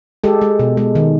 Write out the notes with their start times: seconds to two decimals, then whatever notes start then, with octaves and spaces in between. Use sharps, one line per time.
0.24 G#3 G4 A4
0.41 G#3
0.59 B2
0.77 G#3
0.95 D#3